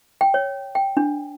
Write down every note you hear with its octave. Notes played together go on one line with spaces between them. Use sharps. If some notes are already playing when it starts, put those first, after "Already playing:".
G5
C#5
G5
D4